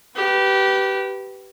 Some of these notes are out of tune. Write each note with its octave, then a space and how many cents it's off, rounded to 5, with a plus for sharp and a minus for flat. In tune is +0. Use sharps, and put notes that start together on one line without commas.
G4 -20 B4 +0